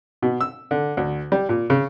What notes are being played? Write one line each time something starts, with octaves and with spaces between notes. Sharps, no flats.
B2
E6
D3
D2
G3
A#2
C#3